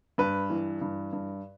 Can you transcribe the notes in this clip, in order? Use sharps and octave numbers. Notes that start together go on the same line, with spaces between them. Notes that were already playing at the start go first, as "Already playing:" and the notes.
G2 B4
E3
G2
G2